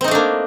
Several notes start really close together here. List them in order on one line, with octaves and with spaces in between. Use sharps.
C4 D#4 A3 D4 A#3